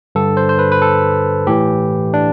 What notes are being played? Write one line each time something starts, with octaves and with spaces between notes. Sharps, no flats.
G2 D3 A4
C5
C5
B4
B4
A4
A2 E3 G4
D4